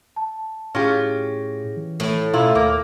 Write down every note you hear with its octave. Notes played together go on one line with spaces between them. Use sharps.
A5
A2 C#4 E4 F4 G4 G#4 A#6
E3
A2
B2 C#4 E4 F4 A#5
D#2 A#3 D6